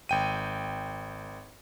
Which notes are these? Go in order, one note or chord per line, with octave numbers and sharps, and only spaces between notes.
G#1 G5 D#7